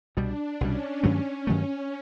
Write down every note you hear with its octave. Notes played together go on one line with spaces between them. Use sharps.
C2 B2 G3 D4
C2 B2 G3 C#4
G2 D#3 F#3 A3 C#4
G2 D#3 F#3 A3 C#4